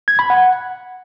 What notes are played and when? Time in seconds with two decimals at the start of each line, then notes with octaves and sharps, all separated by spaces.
0.08 G#6
0.19 B5
0.30 F#5